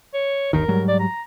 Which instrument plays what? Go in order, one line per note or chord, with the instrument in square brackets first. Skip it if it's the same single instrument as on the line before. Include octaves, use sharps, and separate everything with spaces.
[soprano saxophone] C#5
[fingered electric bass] G1 D#2 D#3 [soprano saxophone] A#4
[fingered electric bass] G#2 F#3 G3
[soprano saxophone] D5
A#5